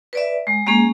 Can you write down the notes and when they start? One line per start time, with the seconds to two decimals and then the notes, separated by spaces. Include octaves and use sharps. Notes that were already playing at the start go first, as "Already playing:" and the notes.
0.13 B4 D5 E5
0.47 G#3
0.67 G#3 A#3 C#4 G#4